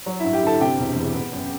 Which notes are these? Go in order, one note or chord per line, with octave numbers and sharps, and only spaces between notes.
F#3
G2 E4 E5
G4 G5
D3 A4 A5
C3 G4 G5
E1
E2
B3
F#2